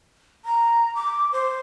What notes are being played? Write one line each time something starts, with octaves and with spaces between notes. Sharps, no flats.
A#5
D6
C5